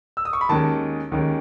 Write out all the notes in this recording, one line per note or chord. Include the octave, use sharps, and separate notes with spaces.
E6
D#6
C#6
B5
D#2 D#3 G#3 C#4 A5
D#2 D#3 G#3 C#4